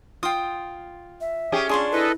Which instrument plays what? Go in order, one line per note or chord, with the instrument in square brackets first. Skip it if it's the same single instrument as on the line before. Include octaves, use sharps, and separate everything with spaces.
[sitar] F4 [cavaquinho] G5 D#6
[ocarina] E5
[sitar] C#4 G4 G#4 [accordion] D#6
[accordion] C#4 [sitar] D4 G#4 [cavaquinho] F4 C6 C#6
[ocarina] E4 [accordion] A4 B4 D#5